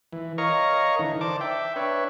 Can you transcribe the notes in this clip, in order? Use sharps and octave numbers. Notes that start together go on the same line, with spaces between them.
E3
A#4 C#5 D#5 F5 A#5 C#6
D3 E3 D#4
C5 D5 A5 D6
E5 G5
D4 B4 C#5 E5